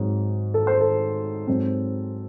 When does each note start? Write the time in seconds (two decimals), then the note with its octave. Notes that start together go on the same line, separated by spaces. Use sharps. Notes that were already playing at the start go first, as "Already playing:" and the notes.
Already playing: G#2 F#3 C4
0.54 A4
0.67 C5
0.81 A4
1.47 G#2 F#3 C4